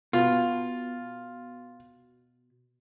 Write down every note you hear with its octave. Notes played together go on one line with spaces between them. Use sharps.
B2 F4